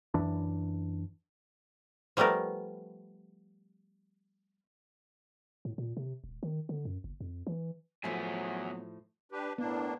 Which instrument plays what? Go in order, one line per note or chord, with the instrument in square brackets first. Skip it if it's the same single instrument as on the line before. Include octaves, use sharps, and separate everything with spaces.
[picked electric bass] F#2 E3 D4
[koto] F3 G3 A3 B3 A#4
[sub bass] A2
A#2
C3
D#1
D#3
D3
F#2
F#1
F2
E3
[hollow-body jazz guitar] A2 F3 A3 [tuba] F#3 [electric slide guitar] B3 E5 G#5
[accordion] D4 G4 B4
[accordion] A2 A#3 D4 [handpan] B3